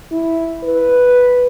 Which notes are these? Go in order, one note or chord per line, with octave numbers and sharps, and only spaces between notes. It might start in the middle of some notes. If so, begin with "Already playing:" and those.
E4
B4